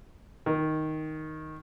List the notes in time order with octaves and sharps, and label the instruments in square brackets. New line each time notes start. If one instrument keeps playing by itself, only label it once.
[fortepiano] D#3